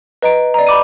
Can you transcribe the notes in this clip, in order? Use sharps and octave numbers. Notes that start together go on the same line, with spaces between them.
B4 D#5 A#5 D7
D5 D#5 A#5
B5 D6 D#7